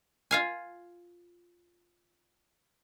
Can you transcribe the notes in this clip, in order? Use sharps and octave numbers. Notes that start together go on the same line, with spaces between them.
F4 F5 G#5